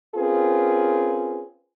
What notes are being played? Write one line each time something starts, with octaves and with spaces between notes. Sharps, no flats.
C4 C#4 F4 G#4 A#4 B4